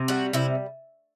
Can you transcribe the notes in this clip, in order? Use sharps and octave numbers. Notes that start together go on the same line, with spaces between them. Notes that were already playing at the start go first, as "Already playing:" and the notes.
Already playing: C3
G3 F#4
C3 E4